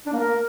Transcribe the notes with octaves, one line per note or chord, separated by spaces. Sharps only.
D4
A#3
A#4